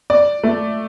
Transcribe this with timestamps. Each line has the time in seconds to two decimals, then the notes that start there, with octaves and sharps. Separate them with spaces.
0.10 D5
0.44 A3